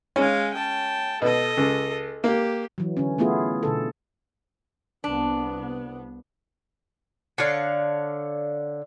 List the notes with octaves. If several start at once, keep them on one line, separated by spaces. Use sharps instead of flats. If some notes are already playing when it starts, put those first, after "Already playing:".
G#3 C#4 F5
G5 A5
B2 A4 D#5
C#2
A#3 G4
E3 F#3
D3 C#4
A3 B3 E4 F4 G#4
B2 D3 A4
C2 B3 D4
D3 D4 C#5 F5